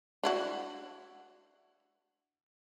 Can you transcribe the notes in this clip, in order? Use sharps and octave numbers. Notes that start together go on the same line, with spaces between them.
D4 E4 F#4